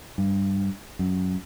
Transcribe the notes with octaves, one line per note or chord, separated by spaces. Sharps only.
G2
F#2